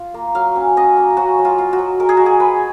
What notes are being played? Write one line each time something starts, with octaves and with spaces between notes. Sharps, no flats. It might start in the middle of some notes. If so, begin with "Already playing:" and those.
Already playing: F4
A#3
F#3 F5
C#4
C#4 D#5
A#3
C#4 F#4
F#3
F4
F4
F#4
F#3
G#3 A#4
G#4
G#3 F#4
G#4
G#3 B4